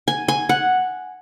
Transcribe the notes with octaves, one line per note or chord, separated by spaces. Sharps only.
G#5
G#5
F#5